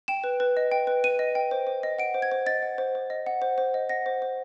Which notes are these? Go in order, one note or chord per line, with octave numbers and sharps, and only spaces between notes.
G5 E7
B4
B4
D#5
G5
B4
B4 D#7
D#5
G5
C5
C5
D#5
F#5 D7
C5
G#6
C5
D#5 A6
F#5
C5
C5
D#5
F#5
C5
C5
D#5
F#5 A#6
C5
C5